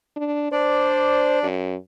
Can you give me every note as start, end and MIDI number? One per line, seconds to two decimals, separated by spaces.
0.16 0.48 62
0.52 1.47 62
0.52 1.38 72
0.52 1.47 74
1.43 1.76 42